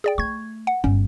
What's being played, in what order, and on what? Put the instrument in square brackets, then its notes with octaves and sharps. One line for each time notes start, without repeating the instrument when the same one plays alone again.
[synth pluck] G#4 D5 G5
[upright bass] A3 [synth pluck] C#6 G#6
[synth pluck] F#5
[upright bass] G1 [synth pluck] C#4